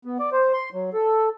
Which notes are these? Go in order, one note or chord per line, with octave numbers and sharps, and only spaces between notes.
B3
D5
C5
C6
F#3
A4